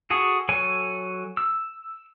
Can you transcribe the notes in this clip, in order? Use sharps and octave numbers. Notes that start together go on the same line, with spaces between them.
F#4 G#4 A4
F#3 A4 C#5 G#5
E6